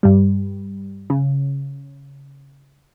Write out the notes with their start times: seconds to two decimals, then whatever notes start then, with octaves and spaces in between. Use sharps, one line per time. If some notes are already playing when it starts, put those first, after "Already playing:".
0.03 G2 G3
1.10 C#3